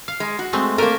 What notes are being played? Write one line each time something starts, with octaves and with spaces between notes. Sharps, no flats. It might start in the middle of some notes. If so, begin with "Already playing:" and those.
F5
G#3
F#4
G#3 A3 C4
A3 A#3 A#4